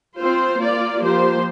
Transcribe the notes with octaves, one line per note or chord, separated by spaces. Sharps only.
C4 F4 C5
A#3 F4 D5
F3 A#3 G4 C5